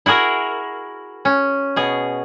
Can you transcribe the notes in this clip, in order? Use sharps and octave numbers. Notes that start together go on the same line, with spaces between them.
E4 F#4 G#4 A#4
C#4
B2 G#4